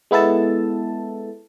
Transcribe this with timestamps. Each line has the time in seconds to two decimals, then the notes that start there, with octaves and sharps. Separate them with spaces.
0.11 G#3 B3 E4 A4 A5